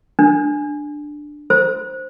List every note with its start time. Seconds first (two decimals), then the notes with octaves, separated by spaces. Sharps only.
0.19 D4
1.50 C5